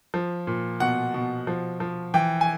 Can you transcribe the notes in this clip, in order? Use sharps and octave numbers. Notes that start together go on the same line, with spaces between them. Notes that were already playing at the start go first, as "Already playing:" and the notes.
F3
A#2
B2 F#5
B2
F3
F3
E3 G5
G#5